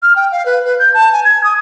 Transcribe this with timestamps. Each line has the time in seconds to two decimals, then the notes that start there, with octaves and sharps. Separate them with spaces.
0.03 F6
0.16 G5
0.32 F5
0.46 B4
0.65 B4
0.79 G6
0.94 A5
1.13 G#5
1.25 G#6
1.44 D#6